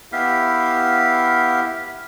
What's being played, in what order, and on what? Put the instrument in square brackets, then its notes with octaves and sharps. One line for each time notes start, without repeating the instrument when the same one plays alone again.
[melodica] B3 E4 G4 F5